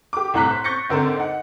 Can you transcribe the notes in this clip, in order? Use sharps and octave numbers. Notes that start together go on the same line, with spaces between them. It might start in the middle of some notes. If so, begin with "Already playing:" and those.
G4 D6
C2 A2 A#5 F#6 B6
C5
C#6 G6 A6 A#6 C#7
G#1 D3 C4 A#4 C5
D#4 F#5